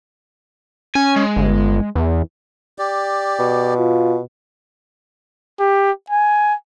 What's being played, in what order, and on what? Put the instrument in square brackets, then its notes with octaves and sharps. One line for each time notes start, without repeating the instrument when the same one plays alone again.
[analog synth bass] C#4 [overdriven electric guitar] G#5
[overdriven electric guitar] G#3
[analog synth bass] G1
E2
[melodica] G4 D5
[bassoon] B2
[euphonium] F4
[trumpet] G4
G#5